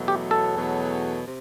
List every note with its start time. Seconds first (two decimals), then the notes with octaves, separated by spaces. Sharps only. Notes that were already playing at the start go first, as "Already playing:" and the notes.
Already playing: E2 B2 F#3 A3
0.08 G4
0.31 A4
0.54 E2 B2 F#3 A3
1.25 C3